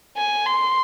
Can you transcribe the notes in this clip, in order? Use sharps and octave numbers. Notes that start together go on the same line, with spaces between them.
G#5
C6